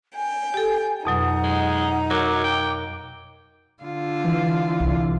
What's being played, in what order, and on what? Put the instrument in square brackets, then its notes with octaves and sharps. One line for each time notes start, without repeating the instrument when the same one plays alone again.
[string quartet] G5 [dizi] G#5
[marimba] G4 A4
[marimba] F2 B2 F#3 [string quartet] D#4 [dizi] F#5
[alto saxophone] G#3
[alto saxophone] F#3 [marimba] A#4 [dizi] D6
[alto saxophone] G5
[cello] D3 F4
[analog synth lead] E3
[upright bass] C2